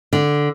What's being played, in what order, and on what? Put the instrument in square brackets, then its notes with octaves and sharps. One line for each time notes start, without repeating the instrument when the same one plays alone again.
[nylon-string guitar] D3